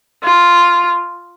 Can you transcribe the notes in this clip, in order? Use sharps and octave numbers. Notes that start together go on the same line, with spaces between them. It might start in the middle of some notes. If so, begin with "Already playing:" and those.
F4